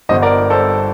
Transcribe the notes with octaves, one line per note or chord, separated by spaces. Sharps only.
G1 G2 D3 C5 D#5
A#4 D5
A4 C5